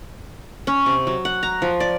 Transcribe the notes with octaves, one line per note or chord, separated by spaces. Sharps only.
C#4
C3
F#3
F#5
A#5
F3
D5